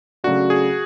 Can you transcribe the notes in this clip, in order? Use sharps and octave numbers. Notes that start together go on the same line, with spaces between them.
C#3 F#3 A3 D4 F#4
G#4